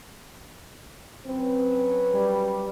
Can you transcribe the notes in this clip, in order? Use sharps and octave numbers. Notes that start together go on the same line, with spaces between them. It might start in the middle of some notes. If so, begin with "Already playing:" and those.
F#3 C4 C#4 B4
G3